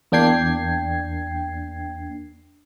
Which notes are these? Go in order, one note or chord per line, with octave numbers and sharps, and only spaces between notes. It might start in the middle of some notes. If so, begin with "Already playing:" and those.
E2 A#3 D4 G5 G#6 C7